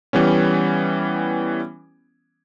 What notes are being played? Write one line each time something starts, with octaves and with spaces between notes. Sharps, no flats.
E3 G3 B3 C#4